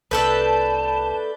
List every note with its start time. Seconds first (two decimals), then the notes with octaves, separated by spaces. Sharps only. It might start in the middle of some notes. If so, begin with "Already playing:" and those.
0.11 C2 A3 D4 A4 B4 A5 G6 A6